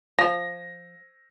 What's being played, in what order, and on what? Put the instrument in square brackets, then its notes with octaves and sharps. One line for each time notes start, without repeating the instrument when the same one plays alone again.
[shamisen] F3 [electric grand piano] A#6